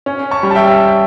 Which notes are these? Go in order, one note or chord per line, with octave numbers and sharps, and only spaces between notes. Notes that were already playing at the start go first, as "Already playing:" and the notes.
C#4
A5 C#6
G3
A5
E5 G5